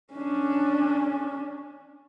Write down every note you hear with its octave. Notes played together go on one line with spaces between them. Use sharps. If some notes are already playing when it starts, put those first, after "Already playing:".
C#4 D4